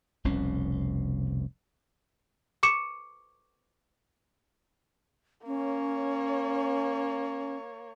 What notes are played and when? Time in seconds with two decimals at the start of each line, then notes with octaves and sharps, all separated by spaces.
0.24 F1 C2 B2 C#4
2.63 C#6 D6 C#7 E7
5.47 A#3 C#4 C#5